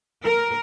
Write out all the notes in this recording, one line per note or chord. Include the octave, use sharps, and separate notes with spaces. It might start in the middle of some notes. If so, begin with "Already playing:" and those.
A#4